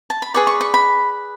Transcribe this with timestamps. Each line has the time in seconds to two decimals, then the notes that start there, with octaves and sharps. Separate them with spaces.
0.10 A5
0.22 B5
0.34 G#4 B4 D5 C#6
0.47 C#6
0.61 C#6
0.74 B5